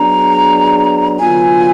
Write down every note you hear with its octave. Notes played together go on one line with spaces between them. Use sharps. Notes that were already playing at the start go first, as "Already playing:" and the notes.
Already playing: F#3 B3 D4 G#4 A#5
D3 F#3 B3 F4 G#5